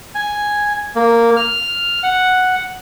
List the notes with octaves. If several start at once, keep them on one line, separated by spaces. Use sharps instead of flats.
G#5
A#3
F6
F#5